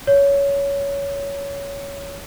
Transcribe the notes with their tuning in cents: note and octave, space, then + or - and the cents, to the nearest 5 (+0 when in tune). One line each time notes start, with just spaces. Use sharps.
C#5 +15